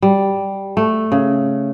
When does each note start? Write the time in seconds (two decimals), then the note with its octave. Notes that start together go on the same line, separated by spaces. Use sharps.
0.02 G3
0.77 A3
1.12 C#3